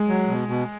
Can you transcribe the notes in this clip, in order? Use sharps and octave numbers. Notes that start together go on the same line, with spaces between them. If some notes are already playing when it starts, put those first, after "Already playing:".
Already playing: G#3
F#3
B2
B2